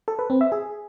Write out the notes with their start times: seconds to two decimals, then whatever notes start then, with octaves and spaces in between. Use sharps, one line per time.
0.08 A4
0.19 B4
0.30 C4
0.41 E5
0.52 G#4